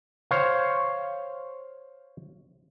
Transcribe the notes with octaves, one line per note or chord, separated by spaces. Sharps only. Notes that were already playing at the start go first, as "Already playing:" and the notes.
C5 C#5 F5